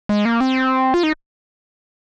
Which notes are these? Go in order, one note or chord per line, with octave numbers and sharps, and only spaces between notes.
G#3
A#3
C4
F4
D#4